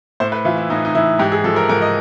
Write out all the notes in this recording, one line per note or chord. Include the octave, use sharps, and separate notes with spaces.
A2 C5
B4
E3 F4
E4
A2 D#4
D#4
E3 E4
G#2 G4
G#4
F3 A4
A#4
G#2 A#4
D#5